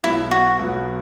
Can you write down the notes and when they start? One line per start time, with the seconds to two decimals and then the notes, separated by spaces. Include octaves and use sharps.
0.03 B1 B2 F#3 B3 E4
0.31 F#4
0.59 B1 B2 F#3 B3